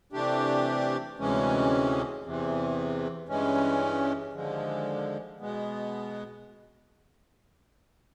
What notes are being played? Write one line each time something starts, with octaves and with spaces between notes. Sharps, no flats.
C3 E3 A3 D4 G4
D2 C3 E3 G#3 C#4
E2 C3 E3
G2 E3 G#3 C#4
D#2 D3 F3 G#3
B2 G#3 B3